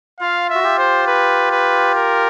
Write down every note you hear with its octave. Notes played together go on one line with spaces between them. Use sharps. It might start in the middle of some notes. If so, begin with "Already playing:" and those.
F4 F5
E5
F#4
F4 G4
C5
B4
B4
A#4